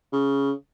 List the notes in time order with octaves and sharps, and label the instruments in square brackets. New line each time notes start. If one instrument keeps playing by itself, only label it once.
[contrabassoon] C#3